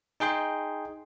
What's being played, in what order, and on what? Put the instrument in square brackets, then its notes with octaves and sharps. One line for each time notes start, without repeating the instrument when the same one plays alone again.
[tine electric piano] D#4 G#4 G5 C6